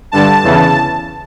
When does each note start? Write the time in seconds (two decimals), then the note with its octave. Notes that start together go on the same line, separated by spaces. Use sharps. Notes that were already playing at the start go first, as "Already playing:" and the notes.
0.12 G2 D3 A5
0.43 E2 C#3 E3